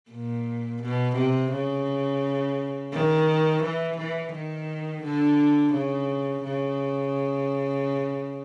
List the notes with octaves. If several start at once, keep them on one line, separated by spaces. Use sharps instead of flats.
A#2
B2
C3
C#3
D#3
E3
E3
D#3
D3
C#3
C#3